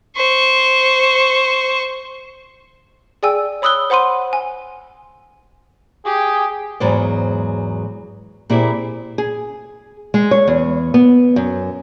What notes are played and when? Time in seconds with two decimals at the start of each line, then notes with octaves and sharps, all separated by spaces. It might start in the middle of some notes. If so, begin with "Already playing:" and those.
0.16 C5 C#6
3.23 G#4 D5 G5 G#5 E6
3.62 C#5 B5 D#6 E6 F#6 G7
3.90 C5 F#5 B5 C6 D#7
4.33 G#5
6.05 G4 G#4
6.80 E2 G#2 F#3 C5 D5
8.50 A#2 C4 E4 G4 G#4
9.18 G#4
10.14 G#3
10.31 C#5
10.47 E2
10.94 B3
11.36 F#2